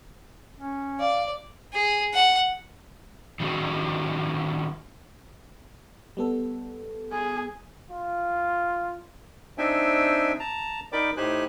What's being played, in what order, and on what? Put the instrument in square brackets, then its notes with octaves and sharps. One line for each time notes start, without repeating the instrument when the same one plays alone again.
[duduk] C#4
[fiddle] D5 [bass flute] F5
[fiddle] G#4
F#5
[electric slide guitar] D#3 G3 C#4 D#4 F#4 G#4
[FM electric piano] G3 B3 A4
[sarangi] G#4
[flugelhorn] F4
[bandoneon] C4 D4 D#4 E5 G5 G#5
A5 A#5
D#4 A#4 D5 G5 B5 D6
A2 D#4 G4 C5 G#5 F#6